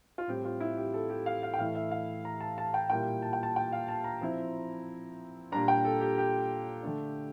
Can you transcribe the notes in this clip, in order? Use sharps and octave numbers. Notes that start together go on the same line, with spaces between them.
F4
A2 G3 C4 G4
F4
E4
G4
A4
G4
F5
F5
G5
A2 E3 A3 E4 F5
E5
F5
A#5
A5
A5
G5
A#2 G3 A#3 E4 G5
A5
G5
A5
G5
F5
A5
A#5
F3 C4 E4
A#2 G3 D4 A#5
G5
A4
G4
G4
D3 A3 D4